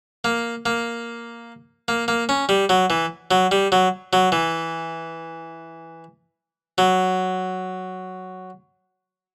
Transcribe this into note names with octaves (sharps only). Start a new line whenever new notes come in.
A#3
A#3
A#3
A#3
C#4
G3
F#3
E3
F#3
G3
F#3
F#3
E3
F#3